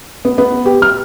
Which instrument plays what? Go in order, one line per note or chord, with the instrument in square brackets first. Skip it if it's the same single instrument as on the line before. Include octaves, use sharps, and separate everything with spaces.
[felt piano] B3
B3
G4
F6